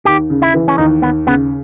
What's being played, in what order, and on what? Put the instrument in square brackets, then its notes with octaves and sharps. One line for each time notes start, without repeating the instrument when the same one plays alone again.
[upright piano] D#2 [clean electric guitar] G4
[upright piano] C#3
[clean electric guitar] E4
[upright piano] E3
[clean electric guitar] C#4
[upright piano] D#2 [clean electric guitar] D#4
[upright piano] D#2 [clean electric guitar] B3
[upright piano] C#3 [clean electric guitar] B3